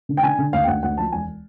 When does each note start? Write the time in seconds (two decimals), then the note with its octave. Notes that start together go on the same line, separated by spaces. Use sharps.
0.09 D3
0.17 G5
0.23 D3 G#5
0.39 D3
0.53 D2 F5
0.64 G5
0.68 D2 F#5
0.83 D2 F#5
0.97 F3 A5
1.12 E1 G#5